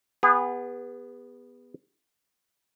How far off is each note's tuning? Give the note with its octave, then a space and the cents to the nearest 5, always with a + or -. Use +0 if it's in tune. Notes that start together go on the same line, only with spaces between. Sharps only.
B3 +0 G#4 -35